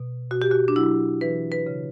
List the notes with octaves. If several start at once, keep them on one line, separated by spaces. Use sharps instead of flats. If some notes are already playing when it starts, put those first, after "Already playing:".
Already playing: B2
B2 F#4
G4
F#4
D4
F#3 E4
E3 B4
B4
C#3